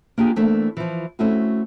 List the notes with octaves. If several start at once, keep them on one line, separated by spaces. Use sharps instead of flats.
A#3 D4 F4 G4 G#4
E3 A3 A#3 C4 D4
E3 F3
A3 C4 C#4 E4 F#4